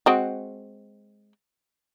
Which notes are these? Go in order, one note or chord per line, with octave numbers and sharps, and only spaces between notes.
G#3 C4 F#4